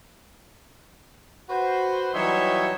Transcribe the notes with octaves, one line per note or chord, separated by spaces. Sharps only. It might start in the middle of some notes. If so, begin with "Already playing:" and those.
F#4 B4 C5
E3 F#3 G3 D#4 C#5 E5